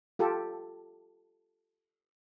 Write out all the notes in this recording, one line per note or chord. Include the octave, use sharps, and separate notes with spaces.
F4 G4 A4